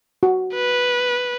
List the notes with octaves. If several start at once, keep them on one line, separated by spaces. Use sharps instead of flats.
F#4
B4